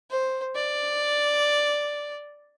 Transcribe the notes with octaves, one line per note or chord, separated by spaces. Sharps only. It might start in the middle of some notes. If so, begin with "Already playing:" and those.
C5
D5